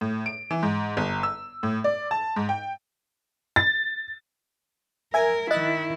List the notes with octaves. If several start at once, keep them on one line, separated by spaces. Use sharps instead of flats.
A2
D7
E3
G#2
G1
E6
A2
D5
A5
G#2
G5
A6
A#4 E5 G#5 G#6
D#3 E4 D#5 F#6 A6